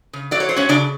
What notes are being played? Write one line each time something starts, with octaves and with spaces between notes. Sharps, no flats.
C#3
F#3 D5
C#5
F#3 C5
C#4 C#5
C#3 D4 D5